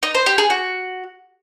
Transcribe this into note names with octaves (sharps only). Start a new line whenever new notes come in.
D#4
C5
G4
G#4
F#4